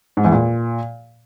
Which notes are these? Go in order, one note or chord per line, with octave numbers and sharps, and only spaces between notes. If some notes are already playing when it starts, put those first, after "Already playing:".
G#2
E2
A#2